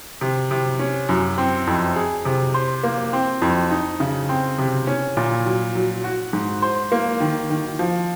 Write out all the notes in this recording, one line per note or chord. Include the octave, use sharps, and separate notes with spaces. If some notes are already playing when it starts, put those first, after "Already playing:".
C3
C3
C#4
F#2
C4
F2
G#4
C3
C5
A#3
C4
F2
D#4
C#3
C4
C3
C#4
A#2
F#3
F#3
F#4
G#2
C5
A#3
D#3
D#3
F3